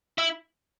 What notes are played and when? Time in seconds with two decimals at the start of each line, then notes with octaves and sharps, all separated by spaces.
0.18 E4